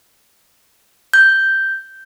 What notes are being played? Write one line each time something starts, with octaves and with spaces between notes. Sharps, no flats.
G6